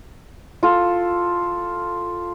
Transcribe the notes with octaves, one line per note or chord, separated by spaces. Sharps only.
F4 A4